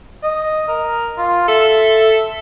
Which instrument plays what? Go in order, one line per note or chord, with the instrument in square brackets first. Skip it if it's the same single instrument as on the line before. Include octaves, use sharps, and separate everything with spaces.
[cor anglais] D#5
A#4
F4
[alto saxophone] A4 [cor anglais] E5